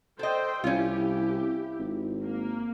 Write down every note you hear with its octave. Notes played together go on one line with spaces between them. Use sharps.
A4 C5 D#5 G5
C2 C#4 E4 F4 G4
G#1
A#3